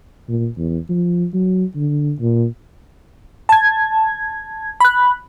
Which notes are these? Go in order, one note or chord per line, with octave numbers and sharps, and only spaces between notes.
A#2
E2
F3
F#3
D3
A#2
A5 G#6
B5 F#6